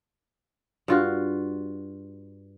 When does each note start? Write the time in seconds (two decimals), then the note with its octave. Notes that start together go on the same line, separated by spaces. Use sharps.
0.88 G2 F4 F#4